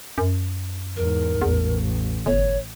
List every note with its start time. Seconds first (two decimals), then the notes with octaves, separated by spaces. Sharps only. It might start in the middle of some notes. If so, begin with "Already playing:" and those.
0.18 F#2
0.96 E2 G#2 A#4
1.42 A1 E2
2.26 G1 C#5